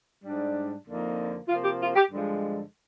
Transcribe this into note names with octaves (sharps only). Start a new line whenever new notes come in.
G#2 G3 D4
F2 D3 F3 A#3 D#4
C3 F3 A#3 F4
G4
F4
G4
G2 D3 F3 G#3